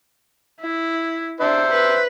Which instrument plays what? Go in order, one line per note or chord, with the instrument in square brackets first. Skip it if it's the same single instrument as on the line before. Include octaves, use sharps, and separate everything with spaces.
[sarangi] E4
[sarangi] D4 [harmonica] C5 E5
[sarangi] B4